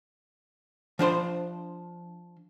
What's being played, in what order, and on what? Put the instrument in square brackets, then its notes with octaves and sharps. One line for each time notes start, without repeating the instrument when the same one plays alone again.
[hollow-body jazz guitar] F3 D4 C5 C6